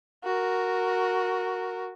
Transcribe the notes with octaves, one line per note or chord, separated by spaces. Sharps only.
F#4 A#4